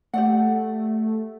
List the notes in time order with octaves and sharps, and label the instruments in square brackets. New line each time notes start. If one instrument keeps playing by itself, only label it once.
[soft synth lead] A3 [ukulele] G4 D5 F#5